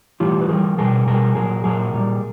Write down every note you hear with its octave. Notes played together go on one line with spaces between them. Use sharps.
A2 E3 G3 F4 G4
B4
A2 E3 G3 G#4 A#4
B2 G3 G#4 A#4
B2 G3 G#4 A#4
A#2 F#3 G#4 A#4
A#2 F#3 G#4 A#4
A#2 G3